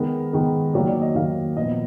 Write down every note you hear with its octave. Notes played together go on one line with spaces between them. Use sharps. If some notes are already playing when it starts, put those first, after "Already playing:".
Already playing: D#3 G#3 B3 A#4
D#3 G#3 B3
D#3 F#3 A#3 D5
D5
D#5
D#3 F#3 A#3 F5
A#2 F3 B3 D#5